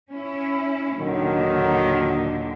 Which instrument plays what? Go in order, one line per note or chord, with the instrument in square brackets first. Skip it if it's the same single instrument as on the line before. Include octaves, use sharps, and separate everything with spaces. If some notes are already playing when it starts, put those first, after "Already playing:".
[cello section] C#4 E4
[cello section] D#2 A#2 D3 [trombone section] D#3 F#3